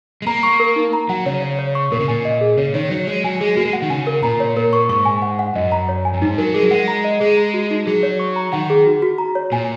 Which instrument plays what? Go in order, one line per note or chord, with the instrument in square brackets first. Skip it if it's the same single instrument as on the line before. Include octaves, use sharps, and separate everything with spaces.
[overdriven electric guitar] G#3
[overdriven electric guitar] A#3 [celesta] A#5
[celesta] C#6
A#4
D#4
A#5
[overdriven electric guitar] F#3 [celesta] F#5
[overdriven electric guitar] C#3 [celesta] C#5
[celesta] C#5
C#5
C#6
[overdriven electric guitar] A#2 [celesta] A#4
[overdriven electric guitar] C#3
[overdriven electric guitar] A#2 [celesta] G#5
[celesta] D#5
G#4
[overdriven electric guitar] C#3 [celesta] C#5
[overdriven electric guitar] D#3 [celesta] C#5
[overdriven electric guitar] F#3 [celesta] C#5
[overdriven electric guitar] G#3 [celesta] C#5
[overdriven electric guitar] F#3 [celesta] G#5
[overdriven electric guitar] G#3 [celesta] G#4
[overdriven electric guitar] A#3 [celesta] F#4
[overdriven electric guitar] G#3
[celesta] F#5
[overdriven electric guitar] D#3
[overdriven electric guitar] C#3 [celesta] G#5
[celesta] A#4
[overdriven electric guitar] A#2 [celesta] A#5
[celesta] C#5
[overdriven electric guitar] A#2 [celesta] A#4
[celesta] C#6
[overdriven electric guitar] G#2 [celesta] C#6
[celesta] G#5
F#5
F#5
[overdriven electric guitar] F#2 [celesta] D#5
[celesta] A#5
C#5
G#5
[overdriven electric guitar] F#2
[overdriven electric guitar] G#2 [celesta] D#4
[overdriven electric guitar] F#3 [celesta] A#4
[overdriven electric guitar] G#3 [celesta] G#4
[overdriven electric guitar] F#3
[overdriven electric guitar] G#3 [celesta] F#5
[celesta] A#5
D#5
[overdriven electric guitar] G#3 [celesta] G#4
[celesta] A#5
F#4
D#4
[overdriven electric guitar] F#3 [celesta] G#4
[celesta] C#5
C#6
A#5
[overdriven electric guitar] D#3 [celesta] F#5
[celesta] G#4
F#4
F#4
A#5
C#5
[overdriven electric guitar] A#2 [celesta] G#5